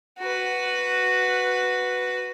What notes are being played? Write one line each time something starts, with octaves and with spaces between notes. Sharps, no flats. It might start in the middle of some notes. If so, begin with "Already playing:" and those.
F#4 B4